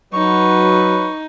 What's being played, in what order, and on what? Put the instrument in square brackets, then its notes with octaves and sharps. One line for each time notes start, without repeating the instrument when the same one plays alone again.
[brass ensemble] F#3 [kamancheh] D#4 [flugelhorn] B4 [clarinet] C#6